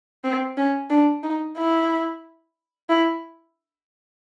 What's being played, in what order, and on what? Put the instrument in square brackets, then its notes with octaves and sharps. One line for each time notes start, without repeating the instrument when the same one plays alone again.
[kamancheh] C4
C#4
D4
D#4
E4
E4